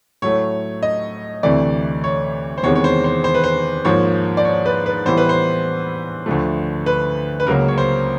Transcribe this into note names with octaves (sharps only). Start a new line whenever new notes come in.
A2 F#3 A3 C#5
D#5
D2 C3 E3 A3 D5
C#5
C5
E2 C3 D#3 G#3 B3 C#5
C#5
C5
C5
C5
B4
C5
G#2 F3 A#3 C#5
D5
C#5
B4
B4
A2 E3 G3 B3 C5
B4
C5
D2 D3 F3 A3
B4
B4
C#2 C#3 F#3 A#3 A#4
C#5
C5